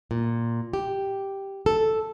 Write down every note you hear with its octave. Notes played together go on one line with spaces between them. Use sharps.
A#2
G4
A4